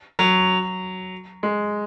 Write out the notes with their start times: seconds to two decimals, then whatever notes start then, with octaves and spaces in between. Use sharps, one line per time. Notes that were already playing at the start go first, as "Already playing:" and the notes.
0.19 F#3
1.43 G#3